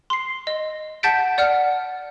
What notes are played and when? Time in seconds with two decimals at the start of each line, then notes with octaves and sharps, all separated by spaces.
0.10 C6 C7
0.47 D#5
1.03 F#5 A5 G6 A6 B6 D7
1.38 D5 F#5 F6 C#7